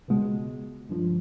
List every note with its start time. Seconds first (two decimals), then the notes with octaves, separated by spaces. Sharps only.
0.08 C#2 B2 G#3
0.89 G2 D3 F3